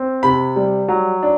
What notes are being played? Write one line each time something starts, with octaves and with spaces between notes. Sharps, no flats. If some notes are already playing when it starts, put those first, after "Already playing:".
Already playing: C4
C3 B5
G3
F#3
D4